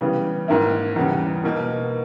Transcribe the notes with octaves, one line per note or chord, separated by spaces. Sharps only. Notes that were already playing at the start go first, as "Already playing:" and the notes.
C#3 E3 G3 B3
G#2 D#3 A#3 E4
E2 C#3 G3
B2 A#3 D#4 A#4